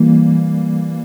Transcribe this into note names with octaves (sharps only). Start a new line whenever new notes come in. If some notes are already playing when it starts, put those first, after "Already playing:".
Already playing: E3 G3 A#3